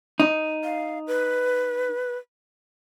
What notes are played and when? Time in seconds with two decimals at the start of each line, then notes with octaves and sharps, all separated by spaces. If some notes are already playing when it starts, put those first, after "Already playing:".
0.20 D#4
0.64 F5
1.07 B4